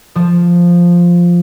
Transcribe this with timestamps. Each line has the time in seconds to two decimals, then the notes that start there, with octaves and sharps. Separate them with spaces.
0.15 F3